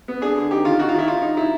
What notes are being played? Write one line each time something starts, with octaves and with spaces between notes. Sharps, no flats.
B3
D4 G#4
D3
D#4 G4
D#3 F4
D#4 F#4
F4
D#3 E4
D#4 F4
D#4
D#4 E4